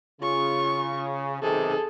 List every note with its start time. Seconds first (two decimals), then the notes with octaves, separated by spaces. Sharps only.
0.21 C#3 F4 C#6
1.42 B1 C3 D#3 G#4 A4